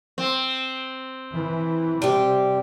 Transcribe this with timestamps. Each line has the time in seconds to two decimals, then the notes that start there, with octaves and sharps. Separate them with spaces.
0.18 C4
1.33 E3
2.02 C3 G3 G4